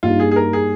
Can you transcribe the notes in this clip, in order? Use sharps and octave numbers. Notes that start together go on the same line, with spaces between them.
G2 G3 A#3 D#4 F4
G#4
G#4
A#4
G#4